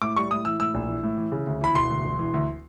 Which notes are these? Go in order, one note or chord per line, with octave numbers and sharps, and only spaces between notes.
A2 D6
G3 C#6
A2 D#6
E3 E6
A2 E6
A#1
E3
A2
E3
C#3
D2
E3 B5
E1 C6
D2
E1
E3
D2